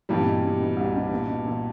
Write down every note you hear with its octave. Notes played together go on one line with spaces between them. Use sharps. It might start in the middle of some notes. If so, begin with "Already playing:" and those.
G2 A#2 E3 G3
C3
B2
A#2
B2
C2 C3
B2
A#2
B2
A#2